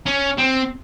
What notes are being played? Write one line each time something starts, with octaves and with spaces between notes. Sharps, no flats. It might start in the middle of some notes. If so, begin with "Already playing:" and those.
C#4
C4